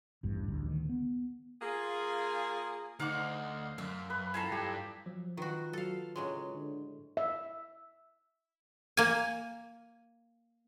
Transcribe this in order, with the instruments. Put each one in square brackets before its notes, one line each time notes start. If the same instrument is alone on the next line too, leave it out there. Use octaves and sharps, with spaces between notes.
[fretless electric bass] A1 E2 G2
A1 D2
D2 D#3
B3
[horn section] A#3 F4 G#4
[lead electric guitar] D2 [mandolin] D#4 F#5 D6 [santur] F5
[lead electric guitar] F#2 [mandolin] E5
[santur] B4
[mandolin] E4 F4 A4 [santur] G#5 A#5
[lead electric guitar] G2 [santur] G4
[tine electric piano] F3 F#3
[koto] D#3 F#4 [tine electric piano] F4 B4
[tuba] F#3 [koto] A4 F5
[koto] A2 F#3 G#3 [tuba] C#3
[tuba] D3
[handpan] E5
[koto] A#3 G#5